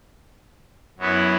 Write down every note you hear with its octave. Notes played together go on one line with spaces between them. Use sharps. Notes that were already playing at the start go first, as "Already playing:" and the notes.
F#2 F#3 B3 E4